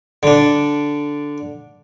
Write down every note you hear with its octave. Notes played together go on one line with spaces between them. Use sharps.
D3 D4